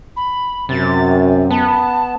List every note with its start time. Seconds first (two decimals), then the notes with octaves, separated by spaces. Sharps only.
0.16 B5
0.69 F#2 C3 A6
1.51 B3 A5